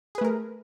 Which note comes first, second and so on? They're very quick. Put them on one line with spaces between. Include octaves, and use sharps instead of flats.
G#4 B4 A3 A#4